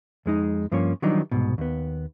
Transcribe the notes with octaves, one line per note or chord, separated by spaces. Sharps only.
F2 G#3 D#4
G2 F3 A#3 C#4 C#5
D#3 E3 F#3 G3 D4 D#4
C2 G#2 B2
D#2 B3